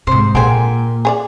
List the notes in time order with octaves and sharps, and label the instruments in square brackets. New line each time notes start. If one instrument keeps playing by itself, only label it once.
[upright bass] G#2 C3 [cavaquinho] C5
[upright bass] A#2 [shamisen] D3 G#4 C5 [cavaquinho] G5 G#5
[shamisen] G#4 C#5 D5